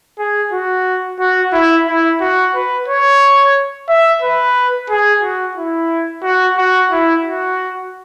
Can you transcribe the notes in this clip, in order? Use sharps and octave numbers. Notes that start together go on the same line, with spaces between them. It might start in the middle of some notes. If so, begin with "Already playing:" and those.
G#4
F#4
F#4
E4
E4
F#4
B4
C#5
E5
B4
G#4
F#4
E4
F#4
F#4
E4
F#4